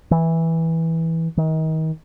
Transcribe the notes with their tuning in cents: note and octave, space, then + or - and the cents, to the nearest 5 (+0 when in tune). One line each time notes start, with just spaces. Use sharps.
E3 -10
D#3 +35